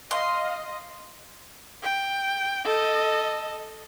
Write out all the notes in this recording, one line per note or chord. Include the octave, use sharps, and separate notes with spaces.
D#5 F5 C6
G5
A4 D#5